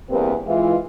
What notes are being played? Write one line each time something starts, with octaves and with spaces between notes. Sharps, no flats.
E2 G2 A#3 C4 G4 B4
E3 G#3 F4